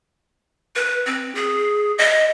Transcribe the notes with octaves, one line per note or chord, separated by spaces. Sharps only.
B4
C4
G#4
D#5